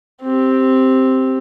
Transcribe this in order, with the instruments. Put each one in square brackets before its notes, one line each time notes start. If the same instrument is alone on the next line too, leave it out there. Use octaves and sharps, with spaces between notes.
[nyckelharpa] C4 G4